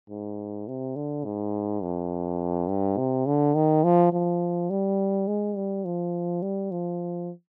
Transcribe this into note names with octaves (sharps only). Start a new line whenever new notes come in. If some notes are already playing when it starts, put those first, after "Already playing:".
G#2
C3
D3
G#2
F2
G2
C3
D3
D#3
F3
F3
G3
G#3
G3
F3
G3
F3